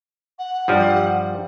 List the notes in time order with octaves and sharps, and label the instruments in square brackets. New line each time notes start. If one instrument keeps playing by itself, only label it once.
[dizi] F#5
[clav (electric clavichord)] G2 F3 G3